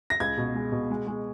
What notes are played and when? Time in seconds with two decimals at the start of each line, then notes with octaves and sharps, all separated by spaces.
0.10 A#6
0.20 C#2 G#6
0.38 B2
0.55 G#3
0.72 B2
0.90 G#3
1.07 G#3